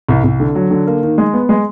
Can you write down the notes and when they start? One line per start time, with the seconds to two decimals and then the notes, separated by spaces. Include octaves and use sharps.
0.09 C2
0.24 C2
0.40 D3
0.55 F#3
0.71 D3
0.87 A#3
1.03 D#3
1.18 G#3
1.34 B3
1.49 G#3